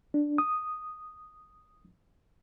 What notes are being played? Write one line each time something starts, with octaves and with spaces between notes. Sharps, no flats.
D4
D#6